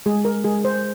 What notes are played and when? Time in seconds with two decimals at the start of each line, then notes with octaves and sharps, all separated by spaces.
0.06 G#3 G#4
0.25 A#4
0.44 G#3 G#4
0.65 C5